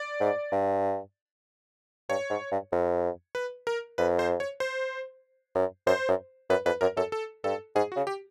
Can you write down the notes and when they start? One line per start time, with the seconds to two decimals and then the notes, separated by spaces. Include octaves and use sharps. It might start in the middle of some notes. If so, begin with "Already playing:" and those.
Already playing: D5
0.21 G#2
0.52 G2
2.09 G2 C#5
2.30 G#2
2.51 G2
2.72 F2
3.35 B4
3.67 A#4
3.98 F2 B4
4.19 C5
4.40 C#5
4.60 C5
5.55 F#2
5.86 F#2 C5
6.08 F#2
6.50 F#2 B4
6.65 F2 B4
6.81 F#2 A#4
6.97 F#2 A4
7.12 A4
7.44 G2 A4
7.76 G#2 G#4
7.92 F#4
7.97 C#3
8.07 G4